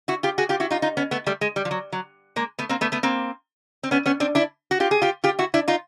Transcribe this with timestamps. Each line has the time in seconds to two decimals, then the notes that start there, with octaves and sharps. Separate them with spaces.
0.08 E4 F#4
0.23 F4 G4
0.38 F#4 G#4
0.49 F4 G4
0.60 E4 F#4
0.71 D#4 F4
0.82 D#4 F4
0.97 B3 C#4
1.11 A3 B3
1.27 G3 A3
1.41 G#3
1.56 G3
1.65 F3
1.71 F#3
1.92 F#3
2.36 G#3 A#3
2.59 A3 B3
2.69 A#3 C4
2.81 A3 B3
2.92 A3 B3
3.03 A#3 C4
3.83 C4
3.91 B3 C#4
4.06 B3 C#4
4.20 C4 D4
4.35 D4 E4
4.71 F#4
4.80 F4 G4
4.91 G#4
5.02 F4 G4
5.24 F4 G4
5.39 E4 F#4
5.54 D4 E4
5.68 D#4 F4